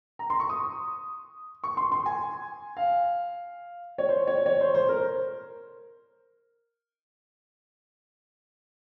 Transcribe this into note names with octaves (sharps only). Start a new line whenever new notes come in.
A#5
C6
C#6
D#6
C#6
C6
C6
G#5
F5
C#5
C5
C#5
C#5
C5
C5
A#4